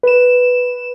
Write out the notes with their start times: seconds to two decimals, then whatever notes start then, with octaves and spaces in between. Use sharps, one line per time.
0.03 B4 E7